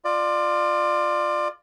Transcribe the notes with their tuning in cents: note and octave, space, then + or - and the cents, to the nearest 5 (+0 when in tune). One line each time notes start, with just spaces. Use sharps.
F4 +0 D5 +25